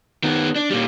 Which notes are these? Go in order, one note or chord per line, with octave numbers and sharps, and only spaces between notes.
D#3 B3
D4
A#2 G3